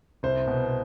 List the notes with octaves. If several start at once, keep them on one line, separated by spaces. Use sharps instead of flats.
C2 C5
B2